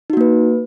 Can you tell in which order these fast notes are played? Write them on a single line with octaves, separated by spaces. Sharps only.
D#4 F#4 A#3 B4